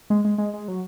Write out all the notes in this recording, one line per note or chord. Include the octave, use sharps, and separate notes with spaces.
G#3
G#3
G#3
G#3
F#3